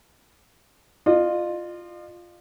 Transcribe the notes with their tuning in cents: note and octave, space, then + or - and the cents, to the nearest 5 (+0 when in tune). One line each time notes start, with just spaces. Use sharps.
F4 +0 D#5 -45